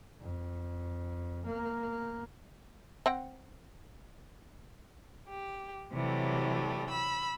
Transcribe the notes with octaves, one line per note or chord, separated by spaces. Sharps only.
F2
A#3
C4 F#5 G5
G4
C3 E3 F#3 G3 A3
B5 E6